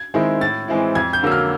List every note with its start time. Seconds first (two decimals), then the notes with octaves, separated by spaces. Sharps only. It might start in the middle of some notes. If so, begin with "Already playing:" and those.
Already playing: G#6
0.14 D#3 G#3 C4 E4
0.41 A2 A6
0.68 E3 G#3 C4 E4
0.95 F2 G#6
1.13 G6
1.22 D3 F#3 A#3 E6
1.32 F6